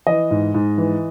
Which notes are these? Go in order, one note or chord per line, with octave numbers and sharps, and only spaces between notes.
E3 D#5
G#2
G#2
E3